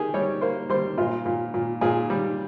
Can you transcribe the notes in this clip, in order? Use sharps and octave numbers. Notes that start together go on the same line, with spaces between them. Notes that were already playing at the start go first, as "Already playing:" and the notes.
Already playing: D#3 G4 G#4
G3 C#5
A#3 C5
G3 C5
A#2 F4
A#2
A#2
A#2 G#4
G3